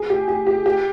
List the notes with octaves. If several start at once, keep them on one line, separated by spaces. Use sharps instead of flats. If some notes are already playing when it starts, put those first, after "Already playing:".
Already playing: G#4
G4
G4
G4
G4